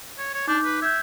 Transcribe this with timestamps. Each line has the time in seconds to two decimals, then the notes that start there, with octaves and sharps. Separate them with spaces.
0.18 C#5
0.34 C#5
0.48 D4 D#4 D6 G6
0.64 B4
0.82 E5 G6 G#6